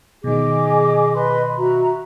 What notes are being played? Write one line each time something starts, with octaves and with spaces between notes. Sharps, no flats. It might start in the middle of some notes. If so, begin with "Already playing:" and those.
B2 D#3 G#4 D#5 D6
B4 D#5 C6
F#4 E5 A#5